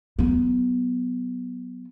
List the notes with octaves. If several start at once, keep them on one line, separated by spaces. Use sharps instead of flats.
F#3 B3